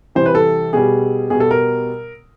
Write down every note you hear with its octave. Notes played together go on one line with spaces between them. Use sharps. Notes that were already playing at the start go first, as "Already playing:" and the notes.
C3 E3 G3 C5
B4
A4
B2 G3 G#4
B2 G3 G#4
A4
A#4